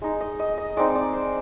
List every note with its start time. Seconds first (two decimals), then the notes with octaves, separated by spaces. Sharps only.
0.02 G#3 D#4
0.21 D#5
0.39 D#5
0.58 D#5
0.77 G#3 C4 D#4 D5
0.95 D5
1.13 C5